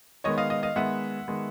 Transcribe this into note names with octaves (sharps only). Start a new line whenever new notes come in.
D#3 G#3 B3 C#5 D#5
D#5 F5
D#5 F5
D#5 F5
D#3 G#3 B3 E5 F#5
D#3 G#3 B3